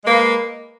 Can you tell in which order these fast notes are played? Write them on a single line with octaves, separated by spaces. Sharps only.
G#3 A#3 B4